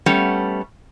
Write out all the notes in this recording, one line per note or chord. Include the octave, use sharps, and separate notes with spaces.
G3 A3 B3 C#4